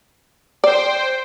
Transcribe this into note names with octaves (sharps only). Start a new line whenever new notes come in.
C5 D5 G5